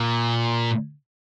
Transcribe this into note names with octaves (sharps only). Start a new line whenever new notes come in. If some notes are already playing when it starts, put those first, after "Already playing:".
Already playing: A#2